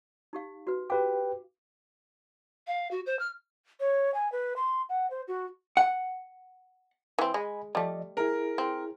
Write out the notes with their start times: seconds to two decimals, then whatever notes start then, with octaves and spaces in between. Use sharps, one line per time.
0.33 D#4 G4 F5
0.67 F#4 B4
0.90 G4 B4 F5 G5 D6
2.67 F5
2.91 F#4
3.06 C5
3.19 F6
3.80 C#5
4.14 G#5
4.32 B4
4.56 C6
4.89 F#5
5.10 C5
5.28 F#4
5.77 F#5
7.19 E3 C4
7.34 G#3 D#5 G#5 B5
7.75 F3 G3 A3 D5 D#5
8.17 E4 G#4 A#4
8.58 C4